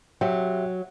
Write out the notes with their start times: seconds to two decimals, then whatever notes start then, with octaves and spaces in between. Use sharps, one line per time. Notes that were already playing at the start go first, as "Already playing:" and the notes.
0.21 F#3 G4 E5 G5